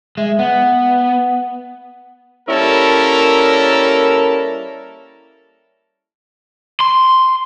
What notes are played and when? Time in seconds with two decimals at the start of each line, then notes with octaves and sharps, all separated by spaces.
0.17 G#3 E5
0.39 B3 F#5
2.48 G3 A#3 C#4 E4 A4 A#4
6.80 C6